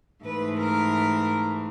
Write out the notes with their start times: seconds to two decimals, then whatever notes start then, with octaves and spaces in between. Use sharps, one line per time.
0.24 G#2 E3 A3 B4
0.58 A#4